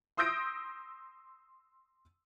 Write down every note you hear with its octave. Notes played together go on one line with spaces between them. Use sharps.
C6 D#6 E6 G6 A#6 D7